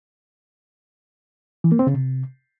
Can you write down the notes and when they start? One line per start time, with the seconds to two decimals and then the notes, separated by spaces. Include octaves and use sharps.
1.64 E3
1.72 A#3
1.79 C4
1.87 C#3
1.94 C3